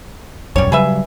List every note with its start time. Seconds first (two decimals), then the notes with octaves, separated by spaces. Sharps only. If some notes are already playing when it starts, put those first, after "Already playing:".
0.56 E1 A#1 F#2 G3 C#5
0.72 C#3 F#3 G3 G#4 B4 E5